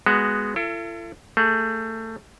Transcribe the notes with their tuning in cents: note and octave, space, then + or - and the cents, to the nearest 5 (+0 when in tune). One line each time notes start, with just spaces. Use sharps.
G#3 -5 B3 +0 F#4 +0
E4 +45 A4 +30
A3 +25 G#4 +20